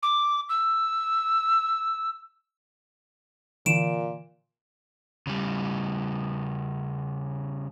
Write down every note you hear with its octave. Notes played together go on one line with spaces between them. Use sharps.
D6
E6
A#2 D3 E3 D7 E7
C#3 G3